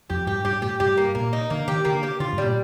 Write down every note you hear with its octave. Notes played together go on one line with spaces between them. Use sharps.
F2 G4
G2 G4
G2 G4
A2 G4
G2 G4
A#3
A#2 A#3
D#4
D3 A#3
D#3 G4
D3 A#3
G4
D3 F4
G2
G3
A#2